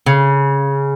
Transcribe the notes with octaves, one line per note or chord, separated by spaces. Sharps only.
C#3